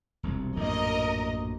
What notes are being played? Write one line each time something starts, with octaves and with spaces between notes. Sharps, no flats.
E1 C2 C3
A#1 F#2 A2 A#4 D#5